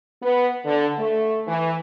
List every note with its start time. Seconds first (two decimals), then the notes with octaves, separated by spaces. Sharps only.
0.23 B3
0.65 D3
0.99 A3
1.47 E3